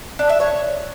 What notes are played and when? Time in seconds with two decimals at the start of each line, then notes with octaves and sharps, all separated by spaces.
0.19 D4
0.29 E5
0.40 C#5